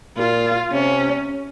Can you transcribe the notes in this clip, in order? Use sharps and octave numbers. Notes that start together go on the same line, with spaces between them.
A#2 F4
C3 C#4